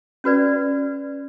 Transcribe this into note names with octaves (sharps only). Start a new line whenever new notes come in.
C#4 F#4 B4 D5